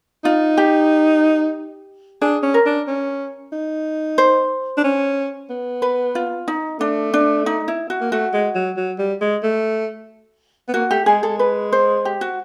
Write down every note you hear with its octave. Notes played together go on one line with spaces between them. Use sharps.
D#4 F4
G4
D4 G#4
C#4
A#4
D4
C#4
D#4
C5
D4
C#4
B3
B4
F4
D#4
A3 D4
D4
D#4
E4
F#4
A#3
A3 F#4
G#3
F#3
F#3
G3
G#3
A3
B3
A#3 F#4
A3 G4
G#3 G#4
G#3 A4
B4
C5
G4
F#4